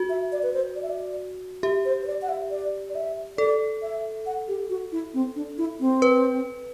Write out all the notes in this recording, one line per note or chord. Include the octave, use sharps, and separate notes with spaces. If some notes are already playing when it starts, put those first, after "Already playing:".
Already playing: F#4
E5
D5
B4
C5
D5
E5
D5
G4 E5
C5
C5
D5
F#5
E5
D5
D5
E5
A4 D5
E5
F#5
G4
F#4
E4
C4
D4
E4
C4
B4